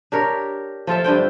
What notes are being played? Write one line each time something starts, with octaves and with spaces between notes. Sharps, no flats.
D4 G4 A#4 C#5
F3 F4 A4 E5
G2 D3 C4 G5